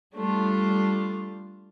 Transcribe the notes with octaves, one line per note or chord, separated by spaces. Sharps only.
G3 A3 D4 F4